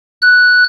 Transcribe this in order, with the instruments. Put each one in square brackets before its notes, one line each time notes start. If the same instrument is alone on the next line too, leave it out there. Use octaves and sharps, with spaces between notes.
[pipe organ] F#6